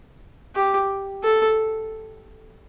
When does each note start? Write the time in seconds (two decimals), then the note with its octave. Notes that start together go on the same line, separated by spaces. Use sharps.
0.56 G4
1.23 A4